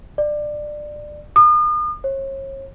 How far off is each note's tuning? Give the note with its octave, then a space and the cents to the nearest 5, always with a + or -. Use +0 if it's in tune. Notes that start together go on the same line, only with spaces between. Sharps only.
D5 +20
D#6 -40
C#5 -40